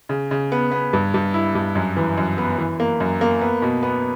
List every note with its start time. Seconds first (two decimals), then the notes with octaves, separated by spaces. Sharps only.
0.09 C#3
0.31 C#3
0.52 B3
0.72 B3
0.93 G2
1.14 G2
1.34 E4
1.55 G2
1.75 F#2
1.97 E3
2.18 F#2
2.38 B3
2.58 E3
2.80 A#3
3.00 F#2
3.21 A#3
3.41 B3
3.62 B2
3.83 B3